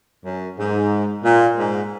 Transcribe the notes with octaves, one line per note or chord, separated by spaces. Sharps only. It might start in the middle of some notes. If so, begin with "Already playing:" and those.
F#2
G#2
A#2
G#2